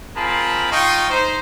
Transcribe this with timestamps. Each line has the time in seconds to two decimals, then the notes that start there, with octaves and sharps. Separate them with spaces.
0.16 C4 F4 G#4 A#4 A5 B5
0.72 D#4 F4 D#5 F5 G5 C#6
1.10 D#4 C5